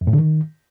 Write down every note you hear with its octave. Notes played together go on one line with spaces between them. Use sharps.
F2
A2
D3
D#3